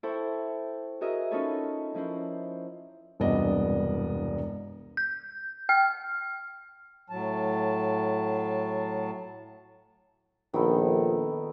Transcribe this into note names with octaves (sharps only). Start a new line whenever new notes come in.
E4 A4 C5 G5 C#6
F#4 G#4 A#4 D#5 E5
C#4 D#4 F4 A4 B4 C#5
F3 C#4 E4 A#4 C5
E1 C2 G2 B3 D5 D#5
G6
G5 F6
A2 F#3 A5
A#1 D#3 B3 A4